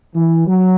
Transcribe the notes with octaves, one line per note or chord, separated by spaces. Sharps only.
E3
F#3